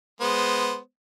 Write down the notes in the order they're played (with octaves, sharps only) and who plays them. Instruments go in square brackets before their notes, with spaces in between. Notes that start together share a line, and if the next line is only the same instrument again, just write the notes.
[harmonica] G#3 B3 C5